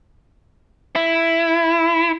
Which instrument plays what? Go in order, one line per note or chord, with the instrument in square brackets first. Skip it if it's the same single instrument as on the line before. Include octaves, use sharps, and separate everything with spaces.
[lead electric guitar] E4